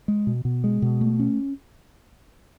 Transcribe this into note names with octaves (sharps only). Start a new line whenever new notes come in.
G#3
B2
B2
G#3
B2
A3
C#4